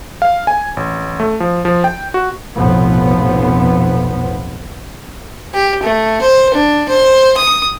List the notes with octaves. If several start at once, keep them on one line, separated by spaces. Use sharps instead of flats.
F5
G#5
A1
A3
F3
F3
G5
F#4
F1 B1 A2 F3 B3
G4
A3
C5
D4
C5
D#6